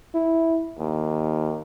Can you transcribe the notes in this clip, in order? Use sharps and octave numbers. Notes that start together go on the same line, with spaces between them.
E4
D#2